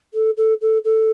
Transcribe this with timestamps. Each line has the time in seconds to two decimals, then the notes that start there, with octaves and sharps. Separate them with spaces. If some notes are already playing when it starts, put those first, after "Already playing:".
0.14 A4
0.37 A4
0.62 A4
0.85 A4